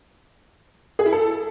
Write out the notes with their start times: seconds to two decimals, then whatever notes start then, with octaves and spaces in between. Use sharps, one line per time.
0.99 G#4
1.06 E4
1.13 A4